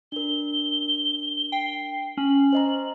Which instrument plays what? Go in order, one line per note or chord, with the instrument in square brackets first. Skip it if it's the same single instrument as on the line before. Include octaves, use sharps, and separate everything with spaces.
[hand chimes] D4 A#4 [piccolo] G7
[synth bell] G5 [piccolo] C7
[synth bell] C#4 [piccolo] F#7
[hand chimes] C5 D#5 A#5